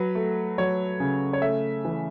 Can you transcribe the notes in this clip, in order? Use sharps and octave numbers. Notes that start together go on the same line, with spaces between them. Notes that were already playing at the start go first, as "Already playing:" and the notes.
Already playing: F#3 B4
A3
F#3 C#5
C#3
C#5
A3 E5
E3